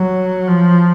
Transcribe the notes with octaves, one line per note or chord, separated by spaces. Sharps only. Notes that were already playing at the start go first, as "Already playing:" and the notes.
Already playing: F#3
F3